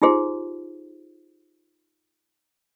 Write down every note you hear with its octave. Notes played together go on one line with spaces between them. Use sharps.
D#4 F4 G4 G#4 C5